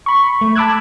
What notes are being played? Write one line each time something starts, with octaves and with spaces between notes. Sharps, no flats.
B5 C#6
A3
A5 B5 D6 E6 F#6 G#6